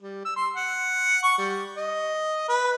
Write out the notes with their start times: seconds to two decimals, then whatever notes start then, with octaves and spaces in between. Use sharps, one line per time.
0.02 G3
0.25 E6
0.36 C6
0.56 F#5
1.23 C#6
1.38 G3
1.77 D#5
2.48 B4